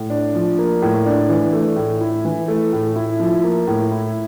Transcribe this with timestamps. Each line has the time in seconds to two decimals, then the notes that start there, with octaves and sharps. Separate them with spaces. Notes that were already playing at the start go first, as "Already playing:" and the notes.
Already playing: A2
0.10 D4
0.35 F3
0.58 A#3
0.82 A2
1.06 D4
1.30 E3
1.53 A3
1.76 A2
2.01 E4
2.25 E3
2.48 A3
2.73 A2
2.96 E4
3.20 F3
3.44 A#3
3.68 A2
3.91 E4